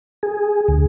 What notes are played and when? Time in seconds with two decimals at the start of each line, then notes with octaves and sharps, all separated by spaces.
0.23 G#4
0.68 D2